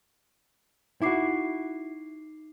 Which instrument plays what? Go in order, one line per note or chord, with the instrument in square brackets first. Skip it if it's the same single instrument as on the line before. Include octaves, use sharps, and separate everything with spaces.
[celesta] D#4 D6 C7 [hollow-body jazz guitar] E4 F#4